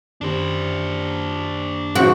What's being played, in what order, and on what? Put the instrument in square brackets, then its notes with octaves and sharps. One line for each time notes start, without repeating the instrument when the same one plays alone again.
[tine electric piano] F#2 D#3 G4 [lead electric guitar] D4 C5
[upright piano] G#2 C#3 F3 [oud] F#4